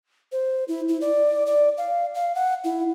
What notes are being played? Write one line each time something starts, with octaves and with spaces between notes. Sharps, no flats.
C5
E4
E4
D5
D5
F5
F5
F#5
E4